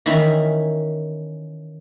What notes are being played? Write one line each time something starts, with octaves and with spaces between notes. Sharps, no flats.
D#3 E3 C#4 E4